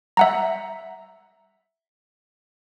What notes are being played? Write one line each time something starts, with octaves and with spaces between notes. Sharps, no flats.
E5 F#5 A#5